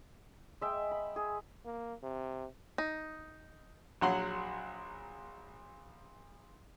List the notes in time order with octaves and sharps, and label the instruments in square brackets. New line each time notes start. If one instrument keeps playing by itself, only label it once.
[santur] G#3 E5 G5
B5
G#4
[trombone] A#3
C3
[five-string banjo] D#4
[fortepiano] A#1 F#3 F#5 C6